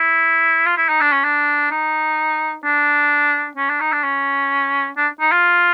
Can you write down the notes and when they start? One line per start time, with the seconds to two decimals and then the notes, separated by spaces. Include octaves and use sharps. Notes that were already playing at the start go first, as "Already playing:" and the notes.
Already playing: E4
0.66 F4
0.77 E4
0.89 D#4
1.01 D4
1.12 C#4
1.24 D4
1.71 D#4
2.64 D4
3.57 C#4
3.69 D4
3.81 D#4
3.92 D4
4.04 C#4
4.97 D4
5.20 D#4
5.32 F4